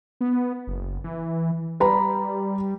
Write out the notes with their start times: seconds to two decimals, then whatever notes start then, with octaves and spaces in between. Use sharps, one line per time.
0.21 B3
0.67 F#1
1.04 E3
1.80 G3 B4 A#5 B5